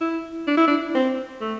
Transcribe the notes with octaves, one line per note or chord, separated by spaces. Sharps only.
E4
D4
E4
D4
C4
A3